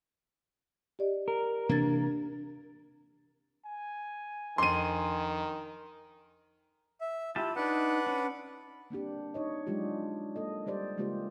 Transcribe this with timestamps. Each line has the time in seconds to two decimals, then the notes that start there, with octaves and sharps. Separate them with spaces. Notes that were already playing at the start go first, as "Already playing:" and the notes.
0.99 G4 D5 D#5
1.28 A#4
1.69 C3 E3 A#3 D4 G#6 A6
3.66 G#5
4.58 F2 D#3 D4 C6 D#7
7.01 E5
7.36 E4 F4 G4 A5
7.56 D4 D#4 B4 F#5
8.07 C#4
8.90 A#3 C4 D4 G4
9.34 D#4 C#5 D#5
9.67 F#3 G#3 D4 F4 G4
10.36 A#3 A4 D#5
10.66 G3 G4 C5 D5
10.97 C#3 G#3 A#3 F4 G4 C5